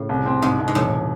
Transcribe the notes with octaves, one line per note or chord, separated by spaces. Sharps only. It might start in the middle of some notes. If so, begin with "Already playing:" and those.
Already playing: A2 C#3
C2
C4
C2 G#2
C2
G#2
E1 A2